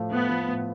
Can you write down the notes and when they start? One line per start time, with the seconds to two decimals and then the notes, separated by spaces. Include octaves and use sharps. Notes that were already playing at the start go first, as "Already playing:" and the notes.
Already playing: A2 F3 A3 F4
0.11 A2 B3
0.29 F3 A3 F4
0.48 A2